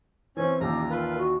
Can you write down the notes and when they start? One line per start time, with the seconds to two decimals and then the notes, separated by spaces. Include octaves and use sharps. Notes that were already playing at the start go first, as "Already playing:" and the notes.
0.37 E3 C4 C#4 G#5
0.61 A1 D#2 A#2 G4 A#5
0.90 F4 A#4 B4
1.17 F#4